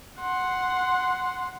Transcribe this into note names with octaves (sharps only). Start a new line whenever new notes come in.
F#5 C6